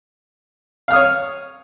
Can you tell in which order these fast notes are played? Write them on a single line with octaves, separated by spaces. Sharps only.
F5 F6 D#6 C#5